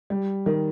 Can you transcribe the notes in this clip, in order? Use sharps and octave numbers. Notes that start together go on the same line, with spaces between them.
G3
D#3